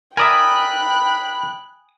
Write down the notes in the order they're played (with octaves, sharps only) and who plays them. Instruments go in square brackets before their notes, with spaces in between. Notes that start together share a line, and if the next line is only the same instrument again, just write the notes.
[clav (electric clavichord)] A#4 D5 E5 [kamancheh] G5 F#6 [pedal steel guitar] G#5 D#6 [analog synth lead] B5